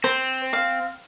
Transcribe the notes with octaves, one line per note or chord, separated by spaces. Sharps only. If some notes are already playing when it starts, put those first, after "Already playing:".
C4 C5
F5